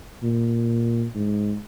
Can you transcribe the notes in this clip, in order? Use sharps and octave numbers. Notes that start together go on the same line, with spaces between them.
A#2
G#2